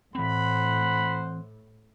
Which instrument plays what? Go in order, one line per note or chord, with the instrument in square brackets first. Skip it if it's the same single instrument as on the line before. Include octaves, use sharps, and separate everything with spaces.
[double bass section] A2 [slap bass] E3 C4 [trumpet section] C5 F#5 [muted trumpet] B5